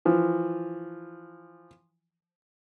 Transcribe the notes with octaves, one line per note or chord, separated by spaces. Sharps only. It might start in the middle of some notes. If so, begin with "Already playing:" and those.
E3 F3